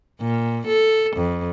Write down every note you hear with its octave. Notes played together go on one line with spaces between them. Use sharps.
A#2
A4
F2